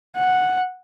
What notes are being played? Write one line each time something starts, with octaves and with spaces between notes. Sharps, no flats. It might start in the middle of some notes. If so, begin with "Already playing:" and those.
F#5